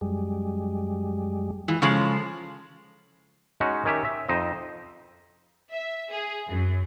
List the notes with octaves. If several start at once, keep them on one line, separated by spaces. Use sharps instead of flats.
F#2 G3 G#3
E3 G#3 F4
C#3 F3 G#3 A4
G#3 C#4 D#4 F#4
D#3 C#4 G4 E5
E5
F2 D#4 C5 D#5
E5
G#4
F#2